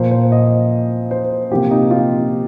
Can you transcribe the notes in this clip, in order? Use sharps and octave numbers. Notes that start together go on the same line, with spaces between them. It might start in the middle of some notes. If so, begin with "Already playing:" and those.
Already playing: A#2 F3 A#3 C5
C5
D#5
C5
C3 F3 A#3 G4
D#4
F4